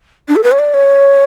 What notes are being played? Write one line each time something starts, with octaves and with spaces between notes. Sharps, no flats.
D4
A4
B4
C#5
D5
C#5